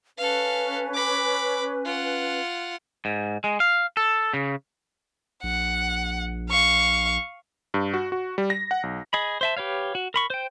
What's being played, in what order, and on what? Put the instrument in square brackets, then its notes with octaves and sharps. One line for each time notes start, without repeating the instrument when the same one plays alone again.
[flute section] C#4 B4 [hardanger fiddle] A4 F5
[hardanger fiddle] B5 D6
F4 F#5
[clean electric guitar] G#2
G#3
F5
A4
C#3
[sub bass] A#1 [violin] F#5
[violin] F5 C#6
[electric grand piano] G2
F#4
F#4
G3
A#6
F#5
B1
[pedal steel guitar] G#4 D#5 B5
C5 E5 A5
G4 B4 C#5 F5
F#4
A#4 B5 C#6
C5 G5